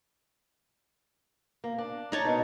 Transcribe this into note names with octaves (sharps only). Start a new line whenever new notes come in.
A#3
D4
D#4 C#5 A5
B2 D#3